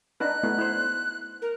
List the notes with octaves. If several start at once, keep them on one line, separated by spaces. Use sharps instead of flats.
D4 D#4 B4 F#6
A3 B3 E4
E4 C5
A#4